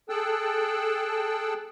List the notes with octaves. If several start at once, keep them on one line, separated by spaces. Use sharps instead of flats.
G#4 A4 G5 A5 E6 F#6